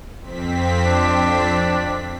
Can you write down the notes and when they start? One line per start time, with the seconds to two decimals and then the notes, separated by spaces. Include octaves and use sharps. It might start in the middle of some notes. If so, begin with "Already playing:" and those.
0.20 F2 C4 B6
0.86 D4